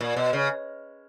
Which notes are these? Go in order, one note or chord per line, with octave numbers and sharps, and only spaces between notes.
A#2
B2
C#3